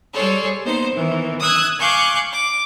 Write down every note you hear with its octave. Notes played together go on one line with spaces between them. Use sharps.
G3 G#4 A4 C5 C#5
A#3 B3 D#4 C5
D#3 E3 B3
D#6 E6 F#6 G#6
F5 G#5 C#6 D6 F#6 G6
D6